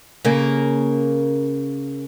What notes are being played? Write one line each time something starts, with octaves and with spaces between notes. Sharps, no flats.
C#3 A#3